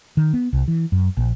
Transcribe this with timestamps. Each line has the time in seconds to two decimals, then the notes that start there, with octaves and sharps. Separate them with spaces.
0.17 D#3
0.34 B3
0.53 C2
0.68 E3
0.92 F#2
1.17 A#1